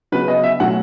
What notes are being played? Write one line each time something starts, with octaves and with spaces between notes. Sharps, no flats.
C#3 F#3 B3 B4
D#5
E5
B2 F#3 A3 F#5